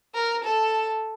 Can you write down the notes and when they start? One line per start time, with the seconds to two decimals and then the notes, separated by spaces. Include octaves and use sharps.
0.14 A#4
0.44 A4